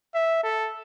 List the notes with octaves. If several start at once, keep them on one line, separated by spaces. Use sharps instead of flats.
E5
A4